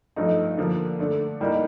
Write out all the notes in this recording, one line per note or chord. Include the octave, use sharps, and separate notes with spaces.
G2 F3 A3 D#4
D3 F3 A#3
D3 A3 D4
A2 G3 A#3 D#4